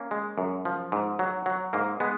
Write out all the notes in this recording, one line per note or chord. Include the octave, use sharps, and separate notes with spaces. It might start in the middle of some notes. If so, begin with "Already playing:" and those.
Already playing: A#3 C#4
G#3
F#2
F3
G#2
F#3
F#3
G#2 A#3
G#3 B3